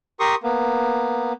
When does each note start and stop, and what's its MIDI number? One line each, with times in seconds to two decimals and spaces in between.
0.20 0.35 67
0.20 0.35 70
0.20 0.35 84
0.20 0.35 85
0.20 0.35 87
0.43 1.33 58
0.43 1.33 59